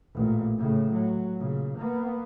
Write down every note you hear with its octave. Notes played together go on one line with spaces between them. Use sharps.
A1 A#2
A2 C#3
F#3
A#2 C#3
A#3 B3